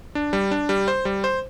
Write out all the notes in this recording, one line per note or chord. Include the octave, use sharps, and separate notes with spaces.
D4
G3
D4
G3
C5
G3
C5